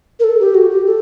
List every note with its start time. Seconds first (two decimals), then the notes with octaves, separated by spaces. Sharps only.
0.20 A#4
0.24 A4
0.40 G4
0.55 F#4
0.71 G4
0.87 A4